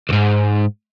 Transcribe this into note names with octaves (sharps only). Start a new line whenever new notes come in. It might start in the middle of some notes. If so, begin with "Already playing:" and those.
C#2 G#2